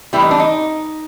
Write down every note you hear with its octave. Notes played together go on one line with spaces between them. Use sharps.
A2 E3 G3 E4
D#4
D4
D#4